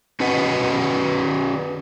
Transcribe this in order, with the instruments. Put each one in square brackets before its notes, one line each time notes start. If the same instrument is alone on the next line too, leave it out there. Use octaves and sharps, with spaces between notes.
[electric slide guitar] C#4 F#4 B4 D#5 F#5